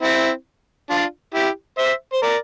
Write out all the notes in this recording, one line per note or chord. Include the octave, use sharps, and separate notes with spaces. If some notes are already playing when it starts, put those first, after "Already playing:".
C4 E4
D4 F4
E4 G4
C5 E5
C5
A#4 D5